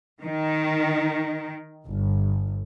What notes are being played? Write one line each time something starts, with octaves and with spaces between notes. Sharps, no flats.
D#3
G1